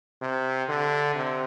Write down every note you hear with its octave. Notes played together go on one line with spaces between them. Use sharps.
C3
D3
C3